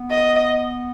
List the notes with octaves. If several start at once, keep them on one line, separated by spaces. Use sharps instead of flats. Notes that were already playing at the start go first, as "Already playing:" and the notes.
Already playing: B3
D#5